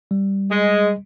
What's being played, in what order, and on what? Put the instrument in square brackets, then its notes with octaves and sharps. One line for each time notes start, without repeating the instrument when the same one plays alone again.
[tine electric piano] G3
[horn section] G#3